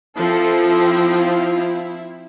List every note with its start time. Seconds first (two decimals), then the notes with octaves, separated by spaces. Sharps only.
0.18 F3 C4 E4 A4
1.09 F4
1.55 E4